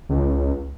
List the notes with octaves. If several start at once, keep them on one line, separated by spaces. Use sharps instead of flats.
C#2